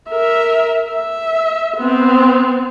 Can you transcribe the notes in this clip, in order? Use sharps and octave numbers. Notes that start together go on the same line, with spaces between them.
A#4 E5
E5
B3 C4